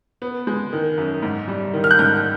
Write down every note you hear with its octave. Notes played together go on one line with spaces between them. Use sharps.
B3
G#3
D#3
F#2
G#2
G3
D#3
F6
F#6
G#2 G6